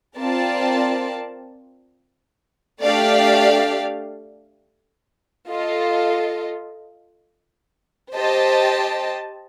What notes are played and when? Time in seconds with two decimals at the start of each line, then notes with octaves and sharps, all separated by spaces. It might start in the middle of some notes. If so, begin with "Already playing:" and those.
0.16 C4 F4 A#4 D5 A5
2.83 A3 D4 G4 D5 F5
5.48 F4 A4 D#5
8.14 G4 C5 D#5 A5